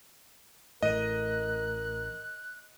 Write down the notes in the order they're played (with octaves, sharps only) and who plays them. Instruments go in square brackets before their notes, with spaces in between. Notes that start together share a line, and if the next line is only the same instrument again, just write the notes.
[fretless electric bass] A1 A2 [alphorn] A#4 [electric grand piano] D#5 D#7 [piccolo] F#6